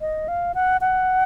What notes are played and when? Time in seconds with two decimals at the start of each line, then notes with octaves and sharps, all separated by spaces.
0.01 D#5
0.28 F5
0.55 F#5
0.81 F#5